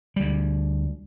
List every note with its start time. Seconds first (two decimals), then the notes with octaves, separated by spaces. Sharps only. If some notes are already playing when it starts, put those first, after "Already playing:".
0.16 D2 G3